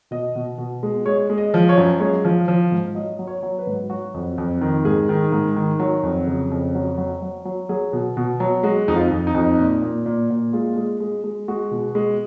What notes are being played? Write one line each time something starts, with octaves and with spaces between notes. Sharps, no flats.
B2 D#5
B2
B2
G#3
G#3 C#5
G#3
D#5
F3
C#5
F#2
G#3 C#5
F3
F3
G#2
F#3 D#5
F#3
C#5
F#3
B4
G#2
F#3 F#4
F2
F2
D#3
G#2 G#4
D#3
G#2
D#3
F#3
F2
C#3
F2
F#3
F#3
F#3
F#3
F#3 G#4
B2
B2
F#3
G#3 F#4
F2 D#4
F4
F2
D#4
F2
A#2
A#2
A#2
A#2
G#3 F4
G#3
G#3
G#3
G#3 F#4
B2
G#3